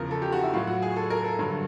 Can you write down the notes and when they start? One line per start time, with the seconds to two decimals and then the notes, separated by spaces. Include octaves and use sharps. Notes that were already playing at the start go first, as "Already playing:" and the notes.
Already playing: E2 C#3 F3 A#4
0.11 A4
0.22 G4
0.32 F#4
0.43 E4
0.53 A2 F#3 F4
0.67 F#4
0.82 G#4
0.96 A4
1.10 A#4
1.24 A4
1.39 G2 D3 F#3